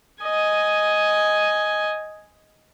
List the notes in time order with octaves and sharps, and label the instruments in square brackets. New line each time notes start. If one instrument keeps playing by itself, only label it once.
[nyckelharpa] D#5 G#5